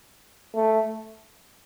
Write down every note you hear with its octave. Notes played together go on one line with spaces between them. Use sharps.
A3